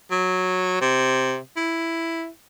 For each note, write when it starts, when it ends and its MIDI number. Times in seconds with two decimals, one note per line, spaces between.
0.11 0.76 54
0.81 1.38 48
1.57 2.28 64